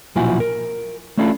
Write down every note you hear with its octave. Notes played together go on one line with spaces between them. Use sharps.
B1 A#2 F3 E4 F#4 G#5
A#4
A3 C#4 D4 E4 F4 A4